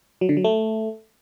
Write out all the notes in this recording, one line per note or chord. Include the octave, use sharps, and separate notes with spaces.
F#3
D3
F#3
A3